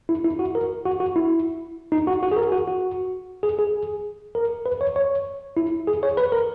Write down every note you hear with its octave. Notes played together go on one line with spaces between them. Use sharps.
E4
E4
F#4
A#4
F#4
F#4
E4
D#4
F#4
F#4
G#4
A#4
F#4
F#4
G#4
G#4
A#4
B4
C#5
C#5
E4
G#4
C#5
B4
A#4